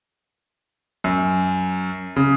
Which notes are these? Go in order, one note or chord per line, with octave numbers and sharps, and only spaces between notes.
F#2
C#3